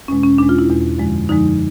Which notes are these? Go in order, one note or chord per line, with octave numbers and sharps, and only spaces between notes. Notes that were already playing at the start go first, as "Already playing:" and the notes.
E2 B2 G#3 C#4
C#4
E2 B2 G#3 D4
F4
E4
E2 B2 G#3
F#2 D3 F3 G#3
F#2 D3 F3 G#3 D#4